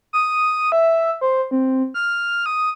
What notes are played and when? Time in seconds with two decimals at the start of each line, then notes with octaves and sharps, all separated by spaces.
0.13 D#6
0.72 E5
1.21 C5
1.51 C4
1.94 F6
2.46 D#6